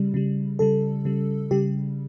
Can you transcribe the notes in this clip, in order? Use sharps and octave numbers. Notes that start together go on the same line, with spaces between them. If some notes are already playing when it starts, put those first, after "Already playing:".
Already playing: C#3 G3
C#3 G3
C#3 G3 A4
C#3 G3
C#3 G3 G4